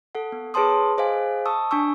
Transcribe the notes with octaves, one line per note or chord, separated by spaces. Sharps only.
A4 F#5
B3
G#4 B4 C#5 A5 C6 D#6
G#4 C5 D#5 F5 G#5
A5 C#6 D#6 E6
D4 G#5 C#6 E6